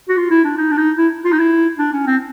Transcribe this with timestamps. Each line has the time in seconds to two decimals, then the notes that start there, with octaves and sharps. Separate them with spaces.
0.09 F#4
0.17 F4
0.30 E4
0.44 D4
0.58 D#4
0.71 D4
0.77 D#4
0.98 E4
1.25 F4
1.32 D#4
1.39 E4
1.79 D4
1.93 C#4
2.06 C4